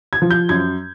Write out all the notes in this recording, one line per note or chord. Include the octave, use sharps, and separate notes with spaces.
G#6
F3
G6
F#2 G#6